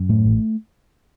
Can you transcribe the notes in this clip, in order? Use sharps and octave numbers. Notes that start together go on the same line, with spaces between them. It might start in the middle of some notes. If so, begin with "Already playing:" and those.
Already playing: F#2
A2 A3
A1